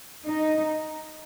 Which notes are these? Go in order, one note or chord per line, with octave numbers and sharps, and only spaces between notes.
D#4